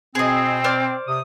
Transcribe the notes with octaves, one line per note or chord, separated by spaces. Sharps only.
B2 C4 G#4 D#5
C5 D5 F6
C3 D#6